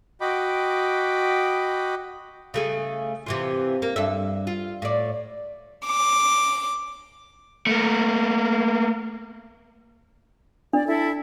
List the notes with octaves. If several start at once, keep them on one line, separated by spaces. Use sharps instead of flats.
F#4 D#5 G5 B5 D6
C#3 A3 G#4
C3 E3 F4
A#3
G2 A4 E5
F4
A2 D5
D6
A3 A#3
D4 D5
E4 A4